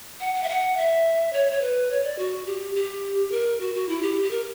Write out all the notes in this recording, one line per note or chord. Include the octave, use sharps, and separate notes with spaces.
F#5
F#5
E5
F#5
E5
C#5
C#5
B4
C#5
D5
F#4
G4
G4
A#4
F#4
F#4
E4
G4
G4
A#4